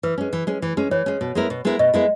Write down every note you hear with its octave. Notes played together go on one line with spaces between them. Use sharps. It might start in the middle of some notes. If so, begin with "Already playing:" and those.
E3 B4
G#3 C#4
E3
G#3 C#4
E3
G#3 C#4
E3 C#5
G#3 C#4
B2
G#3 B3 E4 A#4
B2
G#3 B3 E4 A#4
B2 D#5
G#3 B3 E4 A#4